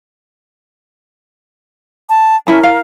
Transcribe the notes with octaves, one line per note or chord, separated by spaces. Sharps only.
A5
C#4 E4 A#4 A5
F5